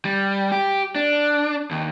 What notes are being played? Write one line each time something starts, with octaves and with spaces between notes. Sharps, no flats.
G3
G4
D4
D#2